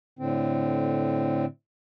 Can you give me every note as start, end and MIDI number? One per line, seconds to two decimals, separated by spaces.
0.19 1.45 45
0.19 1.45 50
0.19 1.45 60